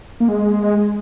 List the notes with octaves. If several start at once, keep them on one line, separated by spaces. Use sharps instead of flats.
A#3
G#3